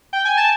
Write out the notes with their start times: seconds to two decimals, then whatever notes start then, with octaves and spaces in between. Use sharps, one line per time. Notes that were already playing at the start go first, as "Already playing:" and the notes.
0.13 G5
0.25 G#5
0.37 A5